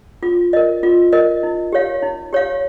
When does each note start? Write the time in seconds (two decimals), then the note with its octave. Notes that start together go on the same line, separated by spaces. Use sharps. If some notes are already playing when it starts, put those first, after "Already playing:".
0.23 F4
0.53 A#4 D#5
0.83 F4
1.13 A#4 D#5
1.43 D#4
1.72 G4 C#5 F5
2.02 D#4
2.33 G4 C#5 F5